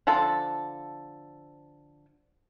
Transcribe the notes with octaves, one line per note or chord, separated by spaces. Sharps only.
D3 F3 A4 A5